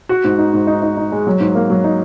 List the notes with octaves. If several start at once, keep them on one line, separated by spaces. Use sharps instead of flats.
F#4
G#2
D#4
G#2
D#4
D#4
D#4
G#3
F#3
G#2
A#3
F#3
D#4